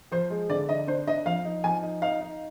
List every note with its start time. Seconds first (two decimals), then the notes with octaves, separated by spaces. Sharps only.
0.12 F3 C5
0.30 G#3
0.50 D3 D5
0.69 D3 D#5
0.87 D4 C5
1.07 D4 D#5
1.25 F3 F5
1.45 D#4
1.64 F3 G#5
1.82 D#4
2.02 D#4 F5
2.21 D#4